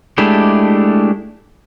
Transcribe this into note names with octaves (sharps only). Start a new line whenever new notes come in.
G#3 A3 D4 E4 G4